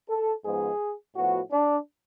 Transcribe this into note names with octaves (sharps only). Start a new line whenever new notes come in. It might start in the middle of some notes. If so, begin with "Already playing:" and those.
A4
G#2 F3 G#3 B3 G#4
A2 F3 B3 F#4
D4